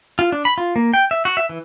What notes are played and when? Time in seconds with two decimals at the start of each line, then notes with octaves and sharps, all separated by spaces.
0.19 F4
0.32 D4
0.45 B5
0.58 F4
0.76 A#3
0.93 G5
1.11 E5
1.25 F#4
1.37 E5
1.49 E3